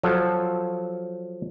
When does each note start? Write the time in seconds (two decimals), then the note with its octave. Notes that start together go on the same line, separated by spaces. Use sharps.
0.03 F3 F#3 A4